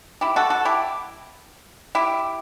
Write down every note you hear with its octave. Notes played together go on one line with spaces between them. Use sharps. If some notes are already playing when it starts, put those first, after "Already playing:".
E4 G4
F#4 A4
F#4 A4
E4 G4
E4 G4